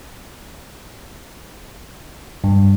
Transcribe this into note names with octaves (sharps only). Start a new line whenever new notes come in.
G2